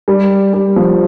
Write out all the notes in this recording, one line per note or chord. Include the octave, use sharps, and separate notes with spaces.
G3
G3
F3